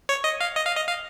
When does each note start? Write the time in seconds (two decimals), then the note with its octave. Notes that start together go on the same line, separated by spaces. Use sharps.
0.09 C#5
0.24 D#5
0.41 F5
0.56 D#5
0.67 F5
0.76 D#5
0.87 F5